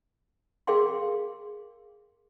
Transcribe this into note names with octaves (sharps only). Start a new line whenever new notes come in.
G#4 A#4 F5 G5 C6